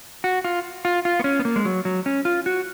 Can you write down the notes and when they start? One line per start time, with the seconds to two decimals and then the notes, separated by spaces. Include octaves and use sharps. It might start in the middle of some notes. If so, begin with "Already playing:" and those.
0.24 F#4
0.44 F4
0.85 F4
1.05 F4
1.19 B3
1.24 C#4
1.39 B3
1.45 A#3
1.56 G#3
1.65 F#3
1.85 F#3
2.06 C#4
2.25 F4
2.46 F#4